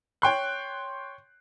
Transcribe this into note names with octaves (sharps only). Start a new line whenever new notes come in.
C#5 G5 C6 F#6